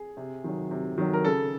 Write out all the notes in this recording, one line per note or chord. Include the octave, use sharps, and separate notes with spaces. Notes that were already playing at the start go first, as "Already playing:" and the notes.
Already playing: G#4
C3
D#3 F#3
C3
D#3 F#3
A#4
C#3 A4